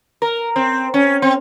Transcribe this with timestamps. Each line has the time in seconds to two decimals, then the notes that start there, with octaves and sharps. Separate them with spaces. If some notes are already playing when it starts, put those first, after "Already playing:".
0.22 A#4
0.56 C4
0.94 C#4
1.22 C4